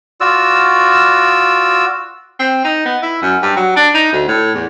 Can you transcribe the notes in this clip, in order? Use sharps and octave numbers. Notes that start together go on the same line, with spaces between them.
F4 F#4 D5 E6
C4
D#4
B3
E4
F#2
G2
F#3
D4
D#4
D2
A2
E2